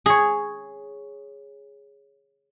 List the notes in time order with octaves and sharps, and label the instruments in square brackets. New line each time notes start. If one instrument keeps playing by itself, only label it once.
[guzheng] G#4 C#5